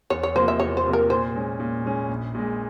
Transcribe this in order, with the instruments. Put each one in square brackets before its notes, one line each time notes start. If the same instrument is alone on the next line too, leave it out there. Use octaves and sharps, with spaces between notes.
[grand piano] E2 [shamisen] C#5
[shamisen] C#5
[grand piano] C3 F3 A#3 [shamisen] C5
[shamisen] E5
[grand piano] E2 [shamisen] C#5
[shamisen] C5
[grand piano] C3 F3 A#3
[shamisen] A#4
[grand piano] A#2 [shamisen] C5
[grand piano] G#3 C#4
A#2
G#3 C#4
A#1
A#2 G#3